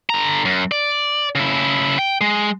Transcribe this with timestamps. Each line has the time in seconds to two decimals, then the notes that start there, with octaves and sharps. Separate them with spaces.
0.10 D3 A#5
0.45 F#2
0.72 D5
1.35 C#3 E4
1.99 G5
2.21 G#3